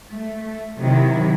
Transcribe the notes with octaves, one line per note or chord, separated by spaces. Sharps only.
A3
C3 D#3 F#3 E4